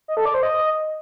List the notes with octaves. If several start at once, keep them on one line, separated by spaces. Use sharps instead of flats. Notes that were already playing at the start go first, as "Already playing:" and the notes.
D#5
A4
D5
C5
D#5